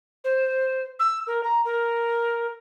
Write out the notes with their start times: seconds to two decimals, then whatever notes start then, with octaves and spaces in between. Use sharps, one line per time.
0.24 C5
0.99 E6
1.27 A#4
1.43 A#5
1.65 A#4